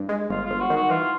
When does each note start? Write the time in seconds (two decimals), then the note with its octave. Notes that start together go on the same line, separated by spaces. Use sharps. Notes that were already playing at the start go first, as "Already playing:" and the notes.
Already playing: G2
0.09 G#3
0.29 G1 F4
0.44 F4
0.50 G1
0.60 F#4
0.70 D#3
0.76 F#4
0.90 E3 F4